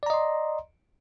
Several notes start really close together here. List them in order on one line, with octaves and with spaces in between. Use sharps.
D5 A#5 D#5 C6